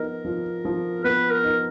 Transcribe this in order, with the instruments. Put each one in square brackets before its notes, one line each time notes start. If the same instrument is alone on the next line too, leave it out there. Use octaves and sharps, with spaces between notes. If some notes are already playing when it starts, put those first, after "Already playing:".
Already playing: [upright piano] F3 B3 D#4 [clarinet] A#4
[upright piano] F3
F3
[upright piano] B3 [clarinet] B4
[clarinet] A#4
[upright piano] D#4